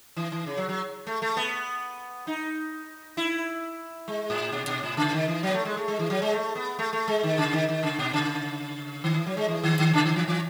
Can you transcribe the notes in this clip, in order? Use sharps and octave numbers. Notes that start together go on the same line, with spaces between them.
E3
E3
C#3
F#3
F#3
A3
A3
B3
D#4
E4
G#3
A2
B2
B2
A2
C#3
D#3
E3
F#3
B3
A3
G#3
A3
G#3
E3
F#3
G#3
A3
B3
A3
A3
G#3
D#3
C#3
D#3
D#3
C#3
B2
C#3
D#3
E3
F#3
G#3
E3
D#3
D#3
C#3
D#3
E3
E3